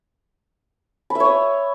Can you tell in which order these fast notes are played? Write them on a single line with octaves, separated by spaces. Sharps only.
B5 E5 C#5 D#6